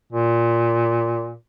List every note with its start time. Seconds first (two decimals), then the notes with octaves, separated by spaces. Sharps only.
0.12 A#2